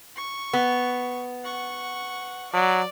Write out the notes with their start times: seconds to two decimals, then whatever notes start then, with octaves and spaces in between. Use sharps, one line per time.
0.16 C#6
0.53 B3
1.44 F#5 C#6
2.53 F#3 D5